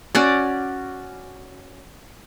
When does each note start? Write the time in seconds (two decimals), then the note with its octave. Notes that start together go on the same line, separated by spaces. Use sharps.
0.15 C#4 F#4 D5